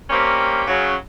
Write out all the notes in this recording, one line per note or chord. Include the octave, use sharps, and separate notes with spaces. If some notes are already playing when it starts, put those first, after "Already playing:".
G3 A#3 C4 C#4 G4
C#3 F#3